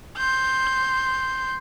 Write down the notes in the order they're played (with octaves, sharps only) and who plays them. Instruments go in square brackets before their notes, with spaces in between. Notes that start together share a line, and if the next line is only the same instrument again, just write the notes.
[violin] C6 G6